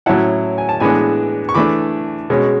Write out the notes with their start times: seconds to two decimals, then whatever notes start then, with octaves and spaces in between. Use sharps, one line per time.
0.06 A2 F#3 C#4 E4 F#5 A5
0.58 G#5
0.69 A5
0.80 A2 E3 G#3 B3 D4 G#5 B5
1.49 C#6
1.54 E3 A3 D4 B5 D6
2.30 B2 G#3 C#4